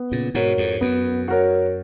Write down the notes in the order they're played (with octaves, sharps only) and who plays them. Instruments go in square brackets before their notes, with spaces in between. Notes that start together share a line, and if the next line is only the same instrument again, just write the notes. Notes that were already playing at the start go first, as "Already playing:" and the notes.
Already playing: [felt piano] B3
[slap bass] A#2 C#3
[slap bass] G#2 B2 [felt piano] F#4 A#4 C#5
[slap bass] F2 G#2
[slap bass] F#2 [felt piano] B3
[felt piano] F#4 A#4 C#5